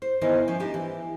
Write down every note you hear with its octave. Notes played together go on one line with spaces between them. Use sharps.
C5
D#3 E3 B3 D#4 A#4 C5
F3 C#4
D4 D#4 G4
E3